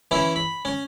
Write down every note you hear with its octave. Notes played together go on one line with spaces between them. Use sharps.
E3 C#4 E4
B5
C#4